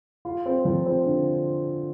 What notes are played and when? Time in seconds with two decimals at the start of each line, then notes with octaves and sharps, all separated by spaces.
0.25 F4
0.46 C4
0.65 F3
0.86 C4
1.06 D3